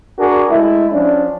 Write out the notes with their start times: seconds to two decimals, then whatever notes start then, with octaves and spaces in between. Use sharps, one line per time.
0.19 D4 F#4 G#4 A#4
0.50 G#3 A3 E4
0.91 F3 C#4 D4